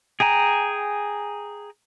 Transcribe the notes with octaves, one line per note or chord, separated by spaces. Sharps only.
G#4 G5 G#5 A#5